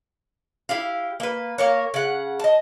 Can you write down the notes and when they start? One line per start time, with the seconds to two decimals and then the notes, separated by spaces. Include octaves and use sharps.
0.69 E4 G4 F5
1.20 A#3 B4
1.58 A#3 A#4 C#5
1.94 C#3 F#5
2.40 D#5 A5